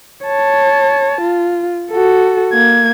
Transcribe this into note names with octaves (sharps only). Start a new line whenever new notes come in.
C#5 A5
F4
F#4 A4
A#3 G#6